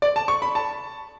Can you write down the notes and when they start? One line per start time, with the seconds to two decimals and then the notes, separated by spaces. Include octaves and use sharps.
0.02 D5
0.16 A5
0.28 C#6
0.42 B5
0.55 A5